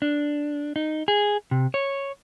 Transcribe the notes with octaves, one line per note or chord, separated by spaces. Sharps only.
D4
D#4
G#4
C3
C#5